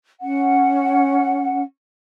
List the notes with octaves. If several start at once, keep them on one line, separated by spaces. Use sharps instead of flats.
C#4 F#5